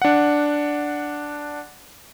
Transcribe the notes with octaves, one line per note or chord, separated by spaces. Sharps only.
D4 F#5